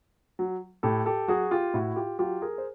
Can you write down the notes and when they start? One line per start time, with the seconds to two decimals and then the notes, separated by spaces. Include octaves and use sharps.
0.39 F#3
0.83 A2 G4 A4
1.06 G4 A4
1.28 F#3 F#4 G#4
1.51 F4 G4
1.74 A2 E4 F#4
1.96 F4 G4
2.19 F#3 F4 G4
2.42 G#4 A#4
2.58 C5